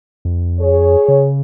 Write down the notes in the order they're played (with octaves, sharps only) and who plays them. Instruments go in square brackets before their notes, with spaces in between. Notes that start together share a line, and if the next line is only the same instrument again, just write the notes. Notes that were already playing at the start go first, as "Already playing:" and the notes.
[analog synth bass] F2
[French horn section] G#4 C#5
[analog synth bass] C#3